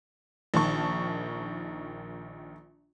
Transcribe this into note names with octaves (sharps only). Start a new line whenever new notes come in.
A#1 D#3 A5 C#6